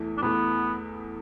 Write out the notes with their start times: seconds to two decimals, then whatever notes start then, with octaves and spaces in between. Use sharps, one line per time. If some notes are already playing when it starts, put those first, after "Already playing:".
Already playing: E2 E3 A3
0.18 D4
0.22 E2 E3 A3 B3